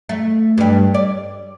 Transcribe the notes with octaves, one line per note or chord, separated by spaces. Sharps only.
A3
G2 G3
D5